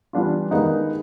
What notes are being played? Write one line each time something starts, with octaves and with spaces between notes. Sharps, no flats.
E3 G3 B3 D4 F4
D#2 D#3 G#3 B3 D#4